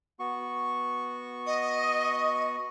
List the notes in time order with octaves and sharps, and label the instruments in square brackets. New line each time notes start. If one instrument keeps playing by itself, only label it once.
[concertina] B3 F#4 C#6
[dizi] D#5